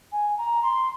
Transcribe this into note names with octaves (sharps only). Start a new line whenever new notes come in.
G#5
A#5
C6